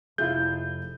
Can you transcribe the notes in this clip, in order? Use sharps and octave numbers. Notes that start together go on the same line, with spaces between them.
F1 E4 F4 G#4 G6